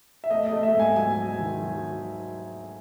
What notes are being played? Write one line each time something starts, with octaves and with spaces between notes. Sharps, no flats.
E5
A3 D#5
D#5
A3
E5
G#2 G#5
F#3 G#5
F#3
D#3
F#3